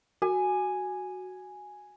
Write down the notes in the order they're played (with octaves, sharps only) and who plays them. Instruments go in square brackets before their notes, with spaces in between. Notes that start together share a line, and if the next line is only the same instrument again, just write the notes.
[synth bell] F#4 [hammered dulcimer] G#5